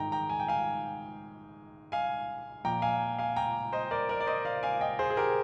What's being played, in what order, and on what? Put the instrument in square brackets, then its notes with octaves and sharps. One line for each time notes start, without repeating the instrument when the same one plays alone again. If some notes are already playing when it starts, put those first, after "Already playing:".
Already playing: [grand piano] G#2 D#3 G5 A#5
G5 A#5
G#5
G5
F5 G#5
F5 G#5
A#2 F3 G5 A#5
F5 G#5
F5 G#5
G5 A#5
C5 D#5
A#4 D5
A#4 D5
D5
C5 D#5
D5 F5
F5 G#5
D#5 G5
G#4 C5
G#4
G4 A#4